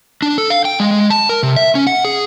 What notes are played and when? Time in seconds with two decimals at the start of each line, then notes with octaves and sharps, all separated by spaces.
0.22 D4
0.38 A4
0.50 F5
0.65 G5
0.80 G#3
1.10 A5
1.29 A#4
1.43 C3
1.56 E5
1.75 C#4
1.87 F#5
2.05 G#4